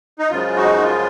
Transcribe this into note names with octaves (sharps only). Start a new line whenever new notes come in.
D#4
F#2 C#3 F3 G#3 F4
D#4 F#4
F4